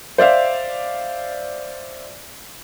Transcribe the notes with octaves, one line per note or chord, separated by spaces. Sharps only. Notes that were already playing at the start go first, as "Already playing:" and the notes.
C5 D5 E5 F5